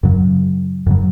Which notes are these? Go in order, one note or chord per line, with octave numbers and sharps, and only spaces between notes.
F#2 C#3 F#3
F#2 C#3 F#3